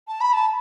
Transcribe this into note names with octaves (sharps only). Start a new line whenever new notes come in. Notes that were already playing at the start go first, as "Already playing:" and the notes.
A5
B5
A5